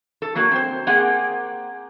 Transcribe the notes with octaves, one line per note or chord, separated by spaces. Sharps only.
A4
F#3 A#3 F#4
C4 C5
A#3 C4 G4 G#4 F#5